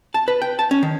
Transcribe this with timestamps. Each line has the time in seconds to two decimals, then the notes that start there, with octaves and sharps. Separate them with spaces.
0.14 A5
0.28 B4
0.42 G5
0.59 A5
0.71 C#4
0.83 D#3